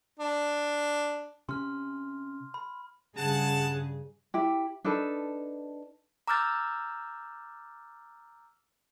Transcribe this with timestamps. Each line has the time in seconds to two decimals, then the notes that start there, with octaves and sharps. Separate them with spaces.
0.19 D4
1.49 C3 C#4 C6 F6
2.54 B5
3.16 G2 C#3 G#4 F#5 A5
4.34 E4 G4
4.84 D4 D#4 A4 B4
6.28 A#5 D6 E6 F6 G6 A6